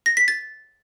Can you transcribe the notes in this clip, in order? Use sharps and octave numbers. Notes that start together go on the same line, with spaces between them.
A#6
B6
A6